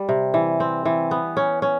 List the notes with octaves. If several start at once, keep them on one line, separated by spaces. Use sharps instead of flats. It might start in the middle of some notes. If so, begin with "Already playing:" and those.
Already playing: G3
C3
E3
C4
E3
B3
C#4
C#4